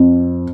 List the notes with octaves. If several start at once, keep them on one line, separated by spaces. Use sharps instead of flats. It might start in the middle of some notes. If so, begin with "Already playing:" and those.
Already playing: F2